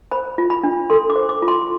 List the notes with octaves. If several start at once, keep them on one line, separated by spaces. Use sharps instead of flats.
C5 B5
F4
B5
D4
A4 C6
D6
C5
D6
F4
C6